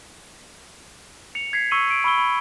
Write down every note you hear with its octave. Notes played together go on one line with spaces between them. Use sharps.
C#7 F7
G#6 B6 C7
C#6 E6 C7 C#7 D#7 F#7
D7
B5 C#6 E6 G7
B5